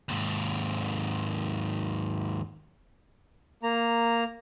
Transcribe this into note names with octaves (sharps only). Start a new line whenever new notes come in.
D#2 G#2
A#3 A#5